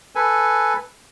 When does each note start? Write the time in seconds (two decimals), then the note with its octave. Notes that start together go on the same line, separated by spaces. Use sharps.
0.15 A4 B4 G#5